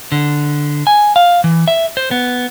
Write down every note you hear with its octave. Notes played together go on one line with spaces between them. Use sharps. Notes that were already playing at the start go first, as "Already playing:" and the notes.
D3
G#5
F5
E3
E5
C5
B3